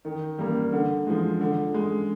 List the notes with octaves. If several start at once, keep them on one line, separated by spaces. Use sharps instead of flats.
D#3
G3 A#3
D3
F3 G#3
D3
G#3